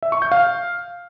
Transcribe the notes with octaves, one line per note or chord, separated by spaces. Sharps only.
E5
C#6
G6
F5